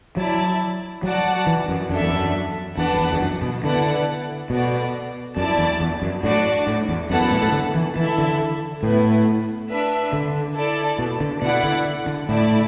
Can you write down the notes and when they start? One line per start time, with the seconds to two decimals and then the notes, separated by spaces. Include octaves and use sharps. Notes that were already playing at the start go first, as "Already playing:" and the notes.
0.17 F#3 E4 D5 A5
1.03 F#3 F#4 D5 F#5 A5
1.47 E3
1.68 F#2
1.90 F#2 D4 A4 E5
2.00 E2
2.11 F#2
2.77 E2 D4 B4 F#5 A5
2.94 F#2
2.99 E2
3.13 E2
3.20 F#2
3.42 B2
3.63 D3 B3 E4 D5 F#5 A5
4.50 B2 B3 F#4 A4 D5
5.36 F#2 E4 D5 A5
5.58 E2
5.80 E2
6.02 F#2
6.23 A2 D4 F#4 D5
6.67 A2
6.88 E2
7.10 F#2 B3 E4 A4 F#5 A5
7.21 F#2
7.31 A2
7.42 A2
7.52 D3
7.74 E3
7.95 E3 E4 A4 E5 A5
8.18 D3
8.82 A2 B3 E4 B4
9.69 D4 B4 E5
10.13 D3
10.55 E4 A4 D5 A5
10.99 B2
11.20 D3
11.42 B2 E4 D5 F#5
11.63 D3
12.06 D3
12.29 A2 E4 D5 A5